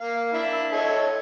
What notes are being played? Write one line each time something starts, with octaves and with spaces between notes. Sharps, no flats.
A#3 F5
D4 E4 E5
A4 C#5 D#5